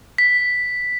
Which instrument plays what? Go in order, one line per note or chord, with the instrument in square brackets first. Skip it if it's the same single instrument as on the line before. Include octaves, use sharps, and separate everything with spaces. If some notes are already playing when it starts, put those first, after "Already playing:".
[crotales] B6